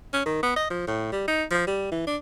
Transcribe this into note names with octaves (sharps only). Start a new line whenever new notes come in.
C#4
D#3
B3
D#5
F3
A2
G3
D#4
F3
G3
E3
D4